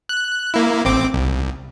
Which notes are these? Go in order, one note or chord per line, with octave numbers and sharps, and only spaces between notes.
F#6
A#3 E4
A1 C4 D6
C2